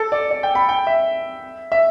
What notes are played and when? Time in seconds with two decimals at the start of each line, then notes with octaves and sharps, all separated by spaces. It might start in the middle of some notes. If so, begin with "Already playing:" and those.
Already playing: A4
0.12 D5
0.31 D5
0.43 G5
0.55 B5
0.69 G5
0.87 E5
1.72 E5